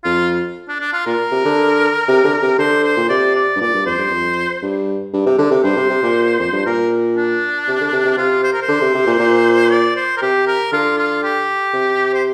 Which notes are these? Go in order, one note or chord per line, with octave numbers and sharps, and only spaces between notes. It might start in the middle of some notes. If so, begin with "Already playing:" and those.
F2 F4
D4
D4
F4
A#2 A#4
C3
D3
C3
D3
C3
D3 C5
C5
A#2
C3 D5
D5
G2
A#2 D5
G2
F2 C5
G2
F2
G2
G2
C3
D3
C3
G2 C5
C3
C3
A#2
F2
G2
A#2 A#4
D4
C3
D3
C3
C3
C3 F4
C5
A#4
C5
D3
C3
C3
A#2
A#2
D5
C5
A#4
C3 G4
A#4
D3 F4
F4
G4
C3
C5